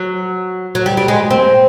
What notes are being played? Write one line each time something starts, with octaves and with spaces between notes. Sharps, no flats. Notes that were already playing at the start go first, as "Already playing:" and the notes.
Already playing: F#3
F#3
G3
G3
G#3
C4